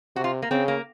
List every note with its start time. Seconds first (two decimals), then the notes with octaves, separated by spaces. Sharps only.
0.16 C3 F#4
0.24 F4
0.42 A#3
0.51 C#3 C4
0.68 A#3